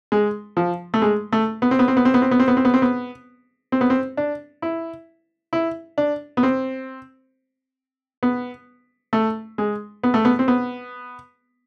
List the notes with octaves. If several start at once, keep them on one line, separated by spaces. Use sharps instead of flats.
G#3
F3
A3
G#3
A3
B3
C4
B3
C4
B3
C4
B3
C4
B3
C4
B3
C4
B3
C4
B3
C4
B3
C4
D4
E4
E4
D4
B3
C4
B3
A3
G#3
B3
A3
B3
C4
B3